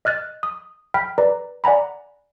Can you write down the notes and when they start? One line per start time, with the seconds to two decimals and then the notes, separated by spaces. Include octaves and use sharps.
0.05 D#5 F6 F#6 A6
0.43 D#6
0.94 G5 B5 F6 B6
1.18 B4 D5 A#5
1.64 D5 F#5 G#5 A#5 B5